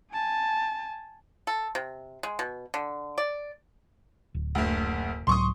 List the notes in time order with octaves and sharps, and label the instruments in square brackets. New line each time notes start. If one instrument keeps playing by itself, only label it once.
[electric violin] G#5 A5
[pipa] A4
C3
G#3
B2
D3
D5
[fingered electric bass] D1
[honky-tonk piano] F#1 D2
[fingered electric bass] C#2 A2 F#3 [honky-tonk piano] C6 C#6 D#6